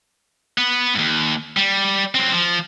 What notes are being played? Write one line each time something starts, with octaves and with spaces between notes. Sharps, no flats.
B3
D#2 G#2
G3
F#3 C4
F3